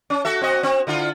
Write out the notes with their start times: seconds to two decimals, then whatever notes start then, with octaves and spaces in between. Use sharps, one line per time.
0.10 C#4
0.25 F#4 A4 E5
0.41 C4 F#4 D#5
0.63 C4
0.87 D3 E4 F4